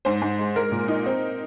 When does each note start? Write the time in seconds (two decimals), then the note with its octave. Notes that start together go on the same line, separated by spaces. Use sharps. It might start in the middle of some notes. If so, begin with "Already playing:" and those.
0.05 G#2 C5
0.22 G#2
0.39 G#3
0.56 G#3 A#4
0.71 A#2
0.88 D#4
1.06 C4